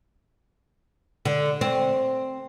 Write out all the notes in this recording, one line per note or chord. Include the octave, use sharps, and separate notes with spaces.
D3
C4